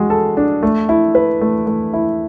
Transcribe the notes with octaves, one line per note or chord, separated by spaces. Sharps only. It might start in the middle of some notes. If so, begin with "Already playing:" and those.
Already playing: G#3 F#4
A4
D4
A3
E4
B4
A3
A3
E4